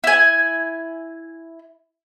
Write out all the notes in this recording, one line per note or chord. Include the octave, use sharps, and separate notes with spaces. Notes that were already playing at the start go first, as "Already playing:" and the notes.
E4 G#5